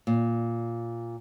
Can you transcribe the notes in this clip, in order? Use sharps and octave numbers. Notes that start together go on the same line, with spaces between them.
A#2